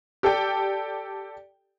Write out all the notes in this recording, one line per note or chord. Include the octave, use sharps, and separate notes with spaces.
G4 A4 D5 G5